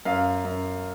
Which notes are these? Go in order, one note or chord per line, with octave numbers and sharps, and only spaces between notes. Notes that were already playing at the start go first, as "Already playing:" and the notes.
F#2 F5
F#2